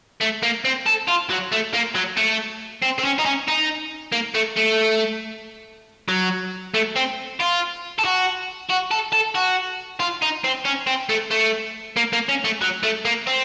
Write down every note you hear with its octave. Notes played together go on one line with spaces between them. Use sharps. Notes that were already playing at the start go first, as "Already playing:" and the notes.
A3
A#3
C4
A4
F4
F#3
A3
A#3
F#3
A3
C4
C4
C#4
D#4
C#4
D#4
A#3
A3
A3
F#3
A3
C4
F4
A4
F#4
F#4
A4
A4
F#4
F4
D#4
C4
C#4
C4
A3
A3
A#3
A#3
C#4
A3
F#3
A3
A#3
C4